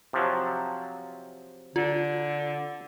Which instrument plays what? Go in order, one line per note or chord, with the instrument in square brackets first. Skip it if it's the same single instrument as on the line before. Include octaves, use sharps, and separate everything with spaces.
[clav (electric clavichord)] C3 F3 F#3
[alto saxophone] D3 [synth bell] F4